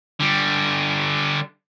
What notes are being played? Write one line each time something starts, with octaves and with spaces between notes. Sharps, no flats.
D3 G3